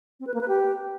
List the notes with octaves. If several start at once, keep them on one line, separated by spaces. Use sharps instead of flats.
C4
B4
A#3
B4
G4